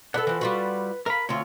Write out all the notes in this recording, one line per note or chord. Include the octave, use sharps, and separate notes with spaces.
D4 A4 B4 F#5
E3 F3
G3 F4 F#4
A#4 F5 B5
D2 C4 F4 C#5